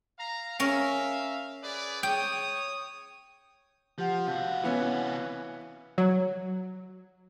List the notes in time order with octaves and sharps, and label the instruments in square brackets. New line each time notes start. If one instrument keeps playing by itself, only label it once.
[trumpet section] F5 A#5
[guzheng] C#4 A#4 [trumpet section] E5 F5
[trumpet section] G#4 B4 D5
[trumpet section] C#5 D#6 [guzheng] G5
[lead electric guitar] F3 [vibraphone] G4 F#5
[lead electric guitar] C3 F#4 [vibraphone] F5
[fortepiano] E3 B3 C#4
[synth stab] F#3